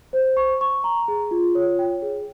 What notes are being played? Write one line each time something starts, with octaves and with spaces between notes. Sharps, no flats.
C5
C#6
C#6
A#5
G#4
F4
C#5
G5
G#4